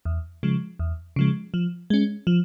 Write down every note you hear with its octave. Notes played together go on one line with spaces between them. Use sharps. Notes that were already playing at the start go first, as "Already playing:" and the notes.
E2
C#3 F3 G#3
E2
C#3 F3 G#3
F3
G#3 C#4
F3